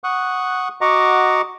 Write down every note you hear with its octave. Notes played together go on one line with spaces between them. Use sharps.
F#5 C#6 D#6 F#6
F#4 D#5 F#5 A#5 C#6 D6